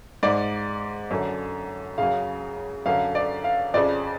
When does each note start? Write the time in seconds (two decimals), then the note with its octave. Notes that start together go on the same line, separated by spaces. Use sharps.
0.23 G#2 D5
1.11 F#2 D3
1.98 F#2 C#3 F5
2.86 F#2 D3 F5
3.15 D5
3.44 F5
3.74 F2 C#3 D5